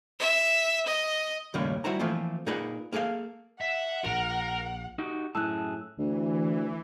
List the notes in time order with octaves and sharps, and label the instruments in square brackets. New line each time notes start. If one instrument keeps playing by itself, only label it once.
[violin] E5
D#5
[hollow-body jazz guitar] D#2 A2 C#3 G3 A#3 C#4
G3 E4 F#4 C5 A#5
E3 F3 A3 A#3 C4 F4
A#2 D#4 G#4 A#4 B4 F#5
A#3 G#4 A4 D5 F5
[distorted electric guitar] E5 [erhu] F#5
[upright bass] A#1 [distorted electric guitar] A#4 A#5
[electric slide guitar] D#4 F#4 G4
[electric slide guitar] F#2 G#4 A5 [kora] A2 F#5 [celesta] E6 F#6
[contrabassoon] D2 [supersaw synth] E3